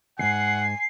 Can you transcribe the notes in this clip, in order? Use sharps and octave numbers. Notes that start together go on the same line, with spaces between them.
D#2 G#2 F#5 G#5 C7